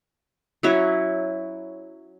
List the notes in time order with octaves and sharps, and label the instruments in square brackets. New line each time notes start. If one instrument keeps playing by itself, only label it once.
[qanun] F#3 C#4 E4 C#5